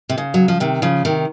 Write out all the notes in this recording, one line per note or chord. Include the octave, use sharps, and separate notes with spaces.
C3
C#3
F#3
F3
C3 D#3
C#3 F3
C3 D#3